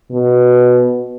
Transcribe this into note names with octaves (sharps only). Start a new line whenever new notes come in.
B2